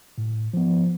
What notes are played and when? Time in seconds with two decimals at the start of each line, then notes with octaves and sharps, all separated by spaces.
0.18 A2
0.54 F3 B3